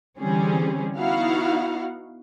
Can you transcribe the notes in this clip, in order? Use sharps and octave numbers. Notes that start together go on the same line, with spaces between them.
D3 E3 G3 C4 C#4 G#4
B3 D#4 E4 F#4 F5 F#5